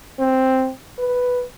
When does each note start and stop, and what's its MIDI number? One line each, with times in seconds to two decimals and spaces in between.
0.19 0.70 60
0.99 1.44 71